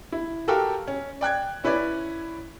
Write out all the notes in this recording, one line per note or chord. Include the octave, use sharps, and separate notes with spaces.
E4
F#4 G4 A4 A#4 F5 G5
C#4
D5 G5 F#6 G#6
C#4 E4 B4 C#5 D5